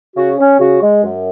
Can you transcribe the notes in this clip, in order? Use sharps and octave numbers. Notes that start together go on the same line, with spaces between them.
C#3 F#4
C#4
C#3 F#4
G#3
F#2